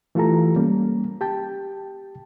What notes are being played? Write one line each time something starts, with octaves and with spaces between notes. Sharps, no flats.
E3 A3 F4 G4 A4 A#5
G3 A#3 C#4
G4 G5 A5